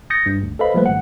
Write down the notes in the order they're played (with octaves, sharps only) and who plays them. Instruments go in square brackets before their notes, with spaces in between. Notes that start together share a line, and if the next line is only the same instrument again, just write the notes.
[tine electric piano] D#6 G6 A6 A#6 C#7
G2
D2
A4 B4 C5 D#5 F5 B5
F3 G3 A3 A#3 B4 C5
G#1 F#5